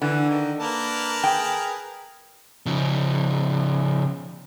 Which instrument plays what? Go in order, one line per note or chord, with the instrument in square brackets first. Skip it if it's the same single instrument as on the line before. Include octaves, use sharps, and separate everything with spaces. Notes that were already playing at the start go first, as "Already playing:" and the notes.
[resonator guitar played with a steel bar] D3 [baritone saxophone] E3
[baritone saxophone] D#3
[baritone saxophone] A#3 [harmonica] A#4 B4 A5
[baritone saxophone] G#4 [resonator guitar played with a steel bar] G5
[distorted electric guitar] C#3 F3